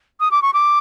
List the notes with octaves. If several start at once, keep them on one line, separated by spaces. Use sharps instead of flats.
D#6
D6
C#6
D6